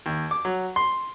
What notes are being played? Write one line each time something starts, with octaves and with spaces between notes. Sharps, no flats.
D#2
D6
F#3
C6